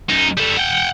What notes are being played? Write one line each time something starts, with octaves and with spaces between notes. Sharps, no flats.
F#2 D#4
G3 A4
F#5 G5